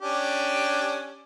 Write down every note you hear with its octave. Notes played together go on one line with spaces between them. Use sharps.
C#4 D4 G4